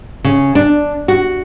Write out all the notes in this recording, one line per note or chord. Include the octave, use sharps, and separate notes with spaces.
C#3
D4
F#4